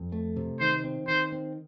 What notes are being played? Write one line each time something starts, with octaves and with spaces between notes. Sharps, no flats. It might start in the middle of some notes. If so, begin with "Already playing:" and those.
Already playing: F2
A3
C3
D#3 C5
C4
D#3 C5
C4